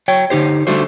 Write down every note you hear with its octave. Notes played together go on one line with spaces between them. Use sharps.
F#3 C#5 G5
D3 D#4 G4 C5
D3 G3 A3 F#4 C5